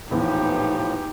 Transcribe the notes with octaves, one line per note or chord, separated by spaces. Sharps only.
A#1 E2 A2 E3 F3 D#4 G4